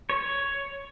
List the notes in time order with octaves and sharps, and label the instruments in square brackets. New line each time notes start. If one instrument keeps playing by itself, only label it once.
[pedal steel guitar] C#5